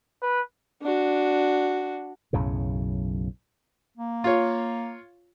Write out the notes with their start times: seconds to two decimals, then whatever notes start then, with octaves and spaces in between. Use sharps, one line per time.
0.22 B4
0.82 D4 F#4
2.33 B1 F#2 A2 C#3
3.97 A#3
4.24 F4 C#5